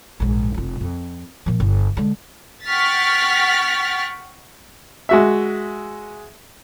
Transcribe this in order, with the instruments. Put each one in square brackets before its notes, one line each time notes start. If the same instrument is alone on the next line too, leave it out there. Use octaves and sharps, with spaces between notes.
[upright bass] A#1 G#2
F1 F4
F2
A#2 F3
G1
D3 G#3
[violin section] F#5 G5 C#6 F6 A6 B6
[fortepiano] G#3 F#4 E5